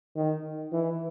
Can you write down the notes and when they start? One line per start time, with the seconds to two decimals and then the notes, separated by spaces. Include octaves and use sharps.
0.16 D#3
0.72 E3